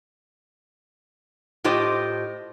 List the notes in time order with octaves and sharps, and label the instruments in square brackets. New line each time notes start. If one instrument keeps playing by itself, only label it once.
[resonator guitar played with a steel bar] A2 F4 G4 C5 D#5